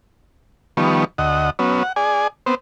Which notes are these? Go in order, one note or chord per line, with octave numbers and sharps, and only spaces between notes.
D#3 F3 G3 B3 C#6
D2 D#5 F#5
F#3 B3 C#4
F#5
G#4 D5 G#5
B3 C4 C5